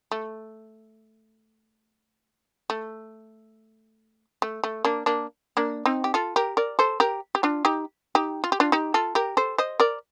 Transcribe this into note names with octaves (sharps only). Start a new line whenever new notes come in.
A3
A3
A3
A3
A#3 D4
A#3 D4
A#3 D4
C4 D#4
G4
F4 A4
G4 A#4
A#4 D5
A4 C5
G4 A#4
G4
D4 F4
D#4 G4
D#4 G4
F4
G4
D4 F4
D#4 G4
F4 A4
G4 A#4
A4 C5
C5 D#5
A#4 D5